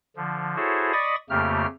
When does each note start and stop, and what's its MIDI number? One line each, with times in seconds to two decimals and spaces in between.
0.16 0.56 50
0.16 0.56 53
0.56 0.92 64
0.56 0.92 66
0.56 0.92 68
0.56 0.92 69
0.56 0.92 72
0.56 0.92 73
0.93 1.15 74
0.93 1.15 75
0.93 1.15 83
0.93 1.15 85
0.93 1.15 87
0.93 1.15 93
1.30 1.66 41
1.30 1.66 49
1.30 1.66 57
1.30 1.66 58
1.30 1.66 67
1.30 1.66 89